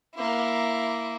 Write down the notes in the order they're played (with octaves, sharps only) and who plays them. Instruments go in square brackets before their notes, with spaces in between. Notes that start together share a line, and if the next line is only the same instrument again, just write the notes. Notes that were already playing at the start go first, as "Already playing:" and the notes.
[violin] A#3 E4